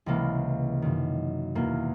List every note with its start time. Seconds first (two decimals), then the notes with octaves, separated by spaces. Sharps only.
0.06 C#2 C3 E3 A#3
0.82 F#2 D#3
1.55 E2 B2 A#3